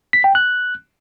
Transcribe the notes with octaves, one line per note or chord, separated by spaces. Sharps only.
B6
G5
F#6